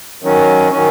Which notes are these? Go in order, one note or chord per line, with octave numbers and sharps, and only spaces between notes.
D#3 F#3 C#4
D#3 F#3 C#4